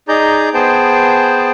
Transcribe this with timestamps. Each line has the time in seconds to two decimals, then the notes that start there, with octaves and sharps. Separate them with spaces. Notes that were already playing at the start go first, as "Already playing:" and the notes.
0.08 D#4 G#4 D5 A#5 G6
0.54 B3 G#4 C5 G5 A5